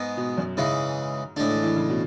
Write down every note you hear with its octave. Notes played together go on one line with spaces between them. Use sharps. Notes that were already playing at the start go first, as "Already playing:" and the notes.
Already playing: G#2 G#3 B3
B2
F#2
G#2 C#3 E3 G#3
A2 D3 G#3 D4
E3
E3
C#3
B2